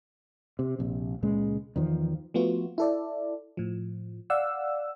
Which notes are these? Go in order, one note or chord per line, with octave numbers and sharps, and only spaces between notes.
C3
A#1 C3
C#2 A#2 C#3 G#3
E2 D#3 F3
F3 A3 B3 F4 F#4
E4 A4 D5
A2 F3
D5 F5 F#5 E6